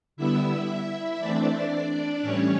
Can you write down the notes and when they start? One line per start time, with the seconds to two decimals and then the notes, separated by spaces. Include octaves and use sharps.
0.17 D3 G3 B3 E4 E5
1.19 E3 A3 C4 D4 D5
2.22 A2 E3 G3 C#4 C#5